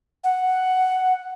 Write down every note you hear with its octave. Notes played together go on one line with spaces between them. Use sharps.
F#5